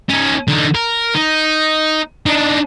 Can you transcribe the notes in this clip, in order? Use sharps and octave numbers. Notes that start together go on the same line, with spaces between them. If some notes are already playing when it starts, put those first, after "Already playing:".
C#4 D#4
D3 D#4
A#4
D#4
D4 D#4